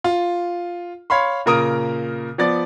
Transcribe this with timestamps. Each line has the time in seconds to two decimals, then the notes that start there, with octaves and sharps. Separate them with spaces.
0.04 F4
1.10 C#5 F5 B5 C6
1.46 A#2 C#3 A#4 A#5 D#6 D7
2.38 F3 B3 D5 A6